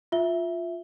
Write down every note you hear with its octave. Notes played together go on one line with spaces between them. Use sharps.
F4 E5 G7